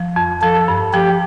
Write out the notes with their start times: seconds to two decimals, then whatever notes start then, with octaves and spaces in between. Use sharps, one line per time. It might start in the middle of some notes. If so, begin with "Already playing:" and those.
Already playing: F3
0.16 F2
0.42 F3 A4
0.68 G2
0.93 F3 G4